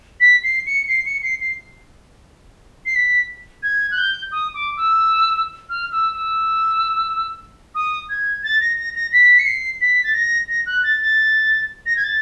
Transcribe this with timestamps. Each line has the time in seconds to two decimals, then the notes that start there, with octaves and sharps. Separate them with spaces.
0.20 B6
0.43 C7
0.67 C#7
0.88 C7
1.06 C#7
1.23 C7
1.40 C7
2.86 C7
2.95 B6
3.63 G#6
3.91 F#6
3.98 G6
4.32 D#6
4.54 D6
4.77 E6
5.70 F6
5.92 E6
6.15 E6
7.75 D#6
8.09 G#6
8.44 A6
8.61 A#6
8.77 A#6
8.95 A#6
9.13 B6
9.39 C#7
9.46 C7
9.81 B6
10.04 A6
10.14 A#6
10.49 A#6
10.66 F#6
10.84 A6
11.01 A6
11.86 A#6
11.97 G#6
12.04 A6